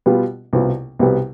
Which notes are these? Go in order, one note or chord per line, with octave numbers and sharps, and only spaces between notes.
B2 G3 B3 F4
C2 B2 B3 F4
C2 B2 G3 B3